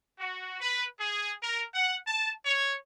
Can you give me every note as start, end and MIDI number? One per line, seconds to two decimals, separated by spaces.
0.19 0.59 66
0.61 0.84 71
0.99 1.31 68
1.41 1.63 70
1.74 1.95 78
2.07 2.31 81
2.46 2.75 73